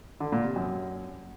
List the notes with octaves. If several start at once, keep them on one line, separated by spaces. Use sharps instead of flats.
D3
A#2
C3
F#2